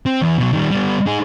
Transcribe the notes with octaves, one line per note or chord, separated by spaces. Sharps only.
C4
E2 E3
B2 F#3
D#3 G3
G3 B3
D#4 G#4